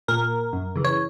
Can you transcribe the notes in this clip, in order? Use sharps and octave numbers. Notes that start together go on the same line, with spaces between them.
A#2 A#4
F#2
C#3 E3
C#5